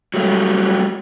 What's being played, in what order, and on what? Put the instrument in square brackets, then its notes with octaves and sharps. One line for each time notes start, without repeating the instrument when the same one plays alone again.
[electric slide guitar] F#3 G3 A3